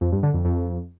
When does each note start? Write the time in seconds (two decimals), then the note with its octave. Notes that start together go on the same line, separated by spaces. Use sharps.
0.01 F2
0.12 G2
0.23 D3
0.34 F2
0.45 F2